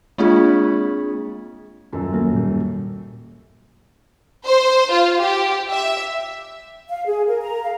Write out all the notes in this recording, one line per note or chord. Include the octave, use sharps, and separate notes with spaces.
G#3 A#3 C4 D4 F4 G#4
D#1 F#2 A4
F#3 A#3
A#2 G3
C5
F4
G4
E5
F5
G#4
A#4
A#5
F5